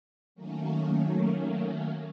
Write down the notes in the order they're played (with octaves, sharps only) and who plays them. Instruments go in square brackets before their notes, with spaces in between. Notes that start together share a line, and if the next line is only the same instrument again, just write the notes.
[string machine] D#3 F#3 A3 A#3 C#4